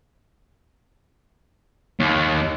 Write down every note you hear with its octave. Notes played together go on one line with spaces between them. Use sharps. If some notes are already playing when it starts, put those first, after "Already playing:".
D#2